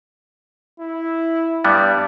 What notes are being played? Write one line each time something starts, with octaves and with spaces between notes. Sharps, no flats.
E4
G2 G3 B3 D5